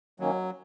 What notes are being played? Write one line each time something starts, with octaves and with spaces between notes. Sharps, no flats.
D#3 F#3 A#3 C#4